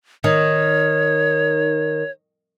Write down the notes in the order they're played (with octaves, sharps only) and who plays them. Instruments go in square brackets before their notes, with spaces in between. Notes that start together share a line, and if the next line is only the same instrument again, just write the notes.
[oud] D#3 [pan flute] C#5